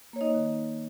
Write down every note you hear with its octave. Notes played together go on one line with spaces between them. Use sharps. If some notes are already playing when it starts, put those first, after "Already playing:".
A#3 C#5
D#4 D#5
D#3